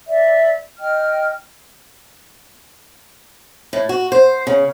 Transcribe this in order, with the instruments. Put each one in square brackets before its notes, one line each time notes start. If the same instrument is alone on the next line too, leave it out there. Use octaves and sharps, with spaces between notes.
[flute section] D5 E5
D#5 G5 F6
[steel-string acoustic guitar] A2
F#4
C5
C#3